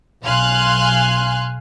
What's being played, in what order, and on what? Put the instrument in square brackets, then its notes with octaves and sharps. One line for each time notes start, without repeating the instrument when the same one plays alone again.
[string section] B1 F5 G#5 C6 F#6